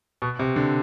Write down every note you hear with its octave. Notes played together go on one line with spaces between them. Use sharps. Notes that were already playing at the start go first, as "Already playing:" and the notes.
B2
C3
D3